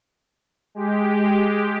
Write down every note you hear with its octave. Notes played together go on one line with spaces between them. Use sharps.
G#3 G4